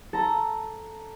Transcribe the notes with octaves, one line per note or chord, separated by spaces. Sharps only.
A4 A#5